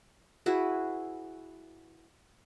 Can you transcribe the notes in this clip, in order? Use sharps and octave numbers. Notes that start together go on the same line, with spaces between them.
E4 F#4 G#4 B4